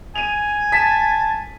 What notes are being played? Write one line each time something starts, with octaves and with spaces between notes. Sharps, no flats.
G#5 D#7 F7
A5 B6